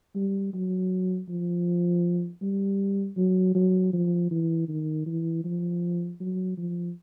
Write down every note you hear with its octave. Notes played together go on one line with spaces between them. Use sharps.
G3
F#3
F3
G3
F#3
F#3
F3
E3
D#3
E3
F3
F#3
F3